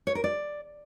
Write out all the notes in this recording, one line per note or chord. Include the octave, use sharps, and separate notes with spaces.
C#5
A#4
D5